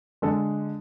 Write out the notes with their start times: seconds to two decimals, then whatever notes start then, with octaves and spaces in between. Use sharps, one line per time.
0.22 D3 G#3 A4